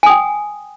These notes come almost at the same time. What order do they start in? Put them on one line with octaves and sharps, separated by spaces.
G#5 D#6 G5